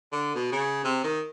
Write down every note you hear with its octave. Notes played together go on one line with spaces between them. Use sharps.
D3
B2
C#3
C3
D#3